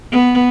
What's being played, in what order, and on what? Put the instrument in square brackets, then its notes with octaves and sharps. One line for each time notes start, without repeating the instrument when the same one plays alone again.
[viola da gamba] B3